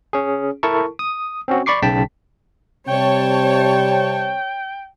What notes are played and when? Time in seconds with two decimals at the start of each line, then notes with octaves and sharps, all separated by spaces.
0.13 C#4 G#4
0.63 E4 A4 A#4 A5 C#6
0.99 D#6
1.48 C4 C#4 F#4
1.66 D5 B5 C#6 D6 C7
1.83 B1 C#3 G5 A5 B6
2.88 C3 G3 C#5 G5 A5